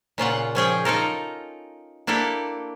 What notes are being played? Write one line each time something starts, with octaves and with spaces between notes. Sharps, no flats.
A#2 C#3 F4 F#5
F3 C#4 G#4 G5
D#4 F4 A4 A#4
A#3 D4 E4 G4 A4